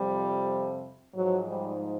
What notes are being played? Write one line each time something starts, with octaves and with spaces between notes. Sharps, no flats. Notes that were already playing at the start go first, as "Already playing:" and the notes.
Already playing: F2 C3 F3 G3
G#2 F3 F#3
G3